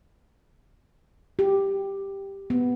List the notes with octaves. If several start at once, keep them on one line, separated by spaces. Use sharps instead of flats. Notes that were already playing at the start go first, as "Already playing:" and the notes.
G4
B3